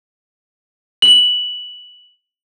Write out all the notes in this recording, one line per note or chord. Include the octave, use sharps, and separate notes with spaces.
F#7